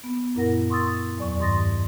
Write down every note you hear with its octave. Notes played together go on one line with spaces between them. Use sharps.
B3
F#2 A#2 E4 A#4 F#5 A#6
C6 C#6 D#6 E6 A6
E2 F#3 D5 C#6
G2 D#3 C6 D#6 A6 A#6